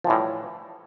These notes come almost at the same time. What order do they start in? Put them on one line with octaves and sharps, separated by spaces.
F3 E3 A2 G3